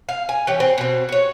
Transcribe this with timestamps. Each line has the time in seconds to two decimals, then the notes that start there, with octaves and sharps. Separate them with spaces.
0.09 F5
0.29 G#5
0.47 E3 C#4 G4
0.60 C4
0.78 B2 C4
1.09 F#4 C#5